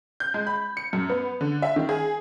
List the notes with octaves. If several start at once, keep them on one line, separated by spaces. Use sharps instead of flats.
G6
G#3
B5
C#7
F#2
B3
D3
E5
D#3
G#4